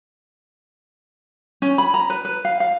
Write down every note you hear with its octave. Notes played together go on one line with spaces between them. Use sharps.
C#4
B5
A#5
B4
B4
F5
F5